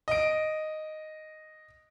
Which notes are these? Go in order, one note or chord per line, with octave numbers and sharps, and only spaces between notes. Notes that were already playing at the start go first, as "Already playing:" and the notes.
D#5 D7